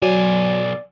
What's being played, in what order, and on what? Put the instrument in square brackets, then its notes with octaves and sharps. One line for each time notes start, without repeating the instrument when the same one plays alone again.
[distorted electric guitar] B1 G#5 [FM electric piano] F#3 [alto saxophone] D5